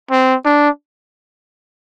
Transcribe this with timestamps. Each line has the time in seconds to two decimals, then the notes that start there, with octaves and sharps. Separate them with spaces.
0.11 C4
0.45 D4